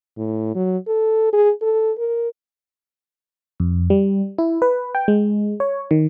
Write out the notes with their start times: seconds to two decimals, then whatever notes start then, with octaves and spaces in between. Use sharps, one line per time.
0.17 A2
0.55 F#3
0.87 A4
1.33 G#4
1.62 A4
1.98 A#4
3.60 F2
3.90 G3
4.38 E4
4.62 B4
4.95 G5
5.08 G#3
5.60 C#5
5.91 D#3